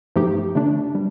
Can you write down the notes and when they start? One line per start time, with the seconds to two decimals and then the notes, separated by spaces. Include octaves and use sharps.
0.16 G2 F3 A3 D#4 G4
0.55 D3 A3 D4
0.95 G3